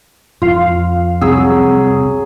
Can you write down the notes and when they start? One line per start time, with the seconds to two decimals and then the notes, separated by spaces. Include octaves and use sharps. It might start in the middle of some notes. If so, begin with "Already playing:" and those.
0.42 F2 F4 F5
1.21 C2 C3 F#3 G#4 E6